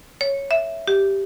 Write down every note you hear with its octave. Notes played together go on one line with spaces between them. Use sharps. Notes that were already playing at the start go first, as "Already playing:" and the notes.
C#5
E5
G4